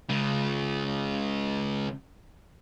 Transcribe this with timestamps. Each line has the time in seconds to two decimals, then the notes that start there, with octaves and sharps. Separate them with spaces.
0.09 C#3 G#3